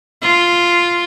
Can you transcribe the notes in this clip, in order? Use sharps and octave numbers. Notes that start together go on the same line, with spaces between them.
F4